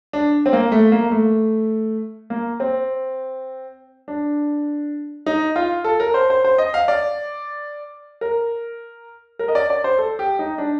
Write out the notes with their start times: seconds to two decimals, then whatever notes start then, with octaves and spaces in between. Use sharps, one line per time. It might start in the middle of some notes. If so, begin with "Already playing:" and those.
0.13 D4
0.46 C4
0.53 A#3
0.72 A3
0.92 A#3
1.11 A3
2.30 A#3
2.60 C4
4.08 D4
5.26 D#4
5.56 F4
5.84 A4
6.00 A#4
6.14 C5
6.30 C5
6.44 C5
6.58 D#5
6.74 F5
6.88 D5
8.21 A#4
9.39 A#4
9.48 D#5
9.55 D5
9.70 D5
9.84 C5
9.99 A4
10.19 G4
10.39 D#4
10.58 D4